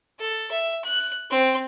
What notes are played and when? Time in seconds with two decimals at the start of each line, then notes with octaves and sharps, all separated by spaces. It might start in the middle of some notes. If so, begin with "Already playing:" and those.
0.20 A4
0.51 E5
0.85 F#6
1.31 C4